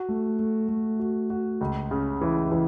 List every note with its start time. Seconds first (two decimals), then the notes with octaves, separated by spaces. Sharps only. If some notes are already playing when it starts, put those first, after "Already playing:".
Already playing: F#4
0.09 A3
0.39 A3
0.69 A3
0.99 F#4
1.30 F#4
1.61 C#2
1.91 C#3
2.21 E3
2.52 E3